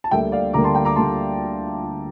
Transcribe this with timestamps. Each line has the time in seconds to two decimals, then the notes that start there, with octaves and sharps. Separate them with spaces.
0.04 A5
0.11 D2 D3 G3 A#3 E5 G5
0.32 D5 F5
0.54 D2 D3 G3 A#3 A#5 D6
0.64 A5 C6
0.75 G5 A#5
0.85 A#5 D6
0.96 D3 G3 A#3 A5 C6